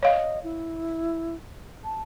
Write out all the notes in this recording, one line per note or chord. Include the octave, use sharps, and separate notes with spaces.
C#5 D#5 F5
E4
A5